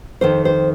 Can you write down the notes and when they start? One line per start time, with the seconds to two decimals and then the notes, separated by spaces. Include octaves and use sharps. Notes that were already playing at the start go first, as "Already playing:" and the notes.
0.21 F2 D#3 C5
0.45 C5